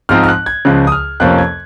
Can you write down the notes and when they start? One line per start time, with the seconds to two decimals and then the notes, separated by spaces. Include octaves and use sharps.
0.09 G#2 F3 C4 D#4 F6
0.24 F6
0.28 F#6
0.46 G#6
0.65 C#2 C#3 F3 F#6
0.87 D#6
0.92 F6
1.20 F2 C3 F3 A#3 C#4 F#6
1.38 G#6